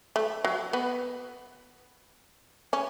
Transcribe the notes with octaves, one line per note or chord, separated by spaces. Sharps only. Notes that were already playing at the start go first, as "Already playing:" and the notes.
A3
F#3
B3
C#4